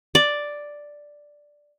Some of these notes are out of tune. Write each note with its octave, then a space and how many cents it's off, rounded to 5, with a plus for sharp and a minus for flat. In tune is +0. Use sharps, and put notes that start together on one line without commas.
D5 +0